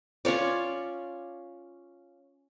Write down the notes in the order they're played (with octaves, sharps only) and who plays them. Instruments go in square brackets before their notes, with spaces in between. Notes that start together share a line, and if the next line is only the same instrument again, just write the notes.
[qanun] C#4 F4 C#5 D5